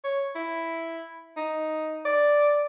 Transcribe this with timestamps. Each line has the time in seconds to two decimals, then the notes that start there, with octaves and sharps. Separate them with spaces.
0.04 C#5
0.35 E4
1.37 D#4
2.05 D5